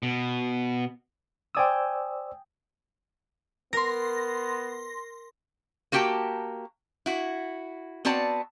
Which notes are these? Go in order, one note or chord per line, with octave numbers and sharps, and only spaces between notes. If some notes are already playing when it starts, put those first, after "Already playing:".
B2
C5 D5 G5 G#5 D#6 E6
B3 A#4 C6 A#6
A#3 F#4 G4 G5 A5
E4 F#4
B3 C4 F#4 D5 A5